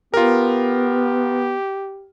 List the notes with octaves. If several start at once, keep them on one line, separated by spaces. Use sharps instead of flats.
B3 F4 G4 A#4